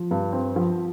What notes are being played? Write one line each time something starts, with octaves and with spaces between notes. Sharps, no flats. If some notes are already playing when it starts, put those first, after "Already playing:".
Already playing: F3
G2
C4
F3